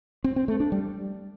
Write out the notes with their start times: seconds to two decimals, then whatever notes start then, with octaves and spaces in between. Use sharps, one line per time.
0.24 C4
0.36 C4
0.48 A3
0.60 D4
0.72 G3